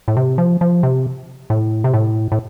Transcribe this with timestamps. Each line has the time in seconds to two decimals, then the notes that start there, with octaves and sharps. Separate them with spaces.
0.08 A2
0.17 C3
0.38 F3
0.61 F3
0.83 C3
1.50 A2
1.84 C3
1.94 A2
2.32 A2